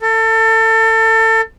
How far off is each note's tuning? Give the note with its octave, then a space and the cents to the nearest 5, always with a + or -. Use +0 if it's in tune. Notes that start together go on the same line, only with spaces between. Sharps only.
A4 +30